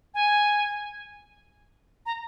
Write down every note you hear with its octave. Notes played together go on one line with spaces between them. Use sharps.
G#5
A#5